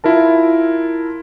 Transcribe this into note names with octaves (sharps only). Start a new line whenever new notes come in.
E4 F4 A#4 A5